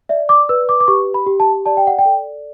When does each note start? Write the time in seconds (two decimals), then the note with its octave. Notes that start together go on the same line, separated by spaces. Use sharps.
0.09 D5 E5
0.29 D6
0.49 B4 E6
0.69 D6
0.80 D6
0.88 G4 C#6
1.14 B5
1.26 G4
1.40 A5
1.66 D5 A5
1.77 G5
1.87 F#5
1.98 G5
2.05 A4